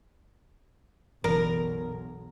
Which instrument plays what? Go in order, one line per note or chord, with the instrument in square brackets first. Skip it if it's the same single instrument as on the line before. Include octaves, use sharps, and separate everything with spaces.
[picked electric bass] F#1 [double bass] B1 [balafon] E3 A#5 [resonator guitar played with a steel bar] A#4